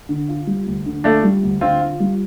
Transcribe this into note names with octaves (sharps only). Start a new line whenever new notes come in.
D3
F4
G3
D2
D3
A3 D4 F4
G3
D2
D3 C4 F4
F4
G3